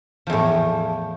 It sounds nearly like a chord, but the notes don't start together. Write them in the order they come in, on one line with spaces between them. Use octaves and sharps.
F3 E2 A2